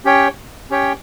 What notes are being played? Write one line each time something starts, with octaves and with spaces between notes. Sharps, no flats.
C#4 G4 C#5 G5
C#4 G4 C#5 G5